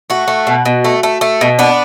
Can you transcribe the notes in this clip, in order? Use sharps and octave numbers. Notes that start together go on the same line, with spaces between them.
A3 F#4
A3
B2
B2
A3
A3
A3
B2
B3 D4